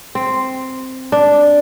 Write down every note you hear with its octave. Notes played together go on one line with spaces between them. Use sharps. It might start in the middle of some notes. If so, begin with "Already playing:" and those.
C4
D4